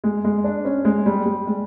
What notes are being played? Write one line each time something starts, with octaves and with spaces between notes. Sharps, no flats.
G#3
G#3
D4
C#4
G#3
G3
G3
G#3